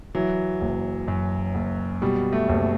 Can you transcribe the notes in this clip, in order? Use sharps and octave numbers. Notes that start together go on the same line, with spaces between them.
E3 F#3
F#1
F#2
F#1
B2 G3
A3
F#1